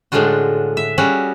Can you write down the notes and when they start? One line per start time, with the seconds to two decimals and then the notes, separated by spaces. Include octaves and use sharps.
0.12 A2 D3 G#3 D4 F4 F#4
0.77 E5
0.98 G3 C#4 F#4 G#4